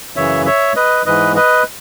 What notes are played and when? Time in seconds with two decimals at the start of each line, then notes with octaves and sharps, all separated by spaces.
0.16 F#2 C#3 E3 C#5 E5
0.46 C#5 E5
0.76 B4 D#5
1.06 G#2 E3 B4 D#5
1.36 B4 D#5